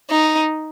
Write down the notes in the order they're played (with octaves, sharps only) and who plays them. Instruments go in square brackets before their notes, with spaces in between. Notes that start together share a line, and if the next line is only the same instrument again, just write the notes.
[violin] D#4